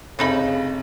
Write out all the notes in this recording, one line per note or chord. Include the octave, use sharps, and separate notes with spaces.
F1 C#3 A3 D#4 B5